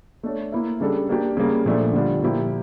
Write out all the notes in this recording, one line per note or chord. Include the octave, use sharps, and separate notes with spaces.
A3 D4 A4 C#5
A#3 E4 A#4 E5
C#3 G3 D4 A4
A#3 D4 G4
C#3 G3 A#3
A#2 F3 A3 D4
D3 G3 D4 F4
A#2 F3 A#3 E4 G4